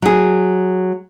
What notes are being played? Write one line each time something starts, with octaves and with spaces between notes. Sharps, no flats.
F#3 G#4